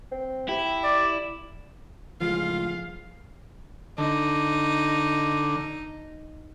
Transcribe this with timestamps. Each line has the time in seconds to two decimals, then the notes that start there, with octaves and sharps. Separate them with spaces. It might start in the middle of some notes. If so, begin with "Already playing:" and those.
0.12 C4
0.49 E4 G4
0.83 D5
2.21 C#2 A2 F3 F4 G#4 F5
3.98 D3 D#4